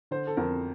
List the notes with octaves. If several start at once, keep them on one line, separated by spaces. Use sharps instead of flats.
D3 C5
A4
F2 A#4